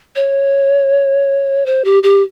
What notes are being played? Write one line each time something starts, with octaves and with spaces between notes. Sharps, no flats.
C#5
C5
G4
G4